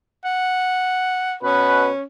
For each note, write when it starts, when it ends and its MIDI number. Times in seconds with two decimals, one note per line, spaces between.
0.25 1.35 78
1.44 1.89 47
1.44 2.03 61
1.44 1.89 71